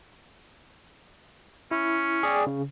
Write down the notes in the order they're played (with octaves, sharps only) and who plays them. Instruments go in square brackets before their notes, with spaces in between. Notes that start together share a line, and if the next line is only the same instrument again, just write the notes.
[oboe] C#4 [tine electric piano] E4
[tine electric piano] G#4 D5 G5
C#3